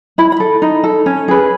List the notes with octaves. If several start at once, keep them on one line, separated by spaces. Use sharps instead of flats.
E4 B5
B5
A4
D#4
A4
C#4
G#4 B4